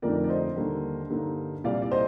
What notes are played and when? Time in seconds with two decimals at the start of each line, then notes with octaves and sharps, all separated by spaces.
0.02 F2 D3 F3 A3 D#4 A#4 D5
0.24 D5
0.29 C5 D#5
0.56 D#2 D3 G3 A#3
1.10 G2 D3 G3 A#3 D#4
1.64 C2 A#2 G3 D5 F5
1.82 D5
1.92 C5 D#5